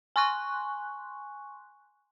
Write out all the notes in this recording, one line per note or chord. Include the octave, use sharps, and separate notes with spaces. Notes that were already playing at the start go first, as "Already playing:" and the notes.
G#5 C6 C#6 F#6